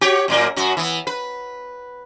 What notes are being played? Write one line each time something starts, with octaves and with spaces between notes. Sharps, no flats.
F#4 G4 C#5
F#2 A2 A#3
F#2 F#4
E3 B3
B4